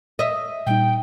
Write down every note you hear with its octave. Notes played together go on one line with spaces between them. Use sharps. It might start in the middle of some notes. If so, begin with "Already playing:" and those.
D#5 E5
A#2 G3 D#4 G5